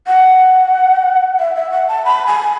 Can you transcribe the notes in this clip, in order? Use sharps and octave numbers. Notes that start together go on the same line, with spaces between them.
F#5
E5
E5
F#5
A5
B5
G#5